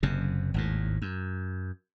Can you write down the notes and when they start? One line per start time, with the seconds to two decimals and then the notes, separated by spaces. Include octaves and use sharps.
0.03 F#1 F#2 C3
0.54 G#1 D#2 A2
1.02 F#2